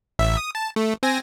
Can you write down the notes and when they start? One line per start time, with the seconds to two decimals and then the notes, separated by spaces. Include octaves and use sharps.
0.19 A1 E5
0.37 D#6
0.55 A5
0.76 A3
1.03 C4 G#5 A#6